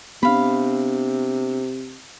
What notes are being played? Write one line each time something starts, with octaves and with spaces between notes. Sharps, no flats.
C3 B3 D4 F5 B5